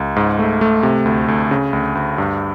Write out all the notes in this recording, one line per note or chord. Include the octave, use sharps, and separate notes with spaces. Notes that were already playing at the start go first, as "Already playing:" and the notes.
Already playing: C#2
G#2
A3
A3
C3
D2
D2
C#3
D2
D2
G2